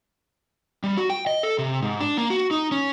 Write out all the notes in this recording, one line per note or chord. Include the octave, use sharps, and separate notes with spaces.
G3
F#4
G5
D#5
A4
C3
G#2
D4
A#3
F#4
D#4
C#4